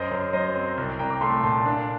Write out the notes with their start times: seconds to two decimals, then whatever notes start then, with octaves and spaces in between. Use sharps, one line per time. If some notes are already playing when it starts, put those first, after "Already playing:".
Already playing: F#2 C5 D#5
0.11 F#2
0.33 F#3 C5 D#5
0.55 C4
0.77 C2
0.99 C2 G5 A#5
1.10 D6
1.21 A3 A5 C6
1.43 A#2 A5 C6
1.66 D4